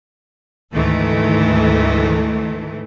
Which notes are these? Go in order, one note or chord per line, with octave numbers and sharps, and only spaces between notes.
D2 G#2 D#3 E3 A3